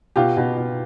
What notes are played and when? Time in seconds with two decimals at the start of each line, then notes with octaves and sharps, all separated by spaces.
0.16 B2 F4 G4
0.37 B2
0.57 B2